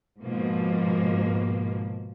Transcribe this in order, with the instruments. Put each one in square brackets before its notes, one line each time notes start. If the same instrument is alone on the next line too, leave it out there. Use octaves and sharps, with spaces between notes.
[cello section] G#2 B2 F3 A#3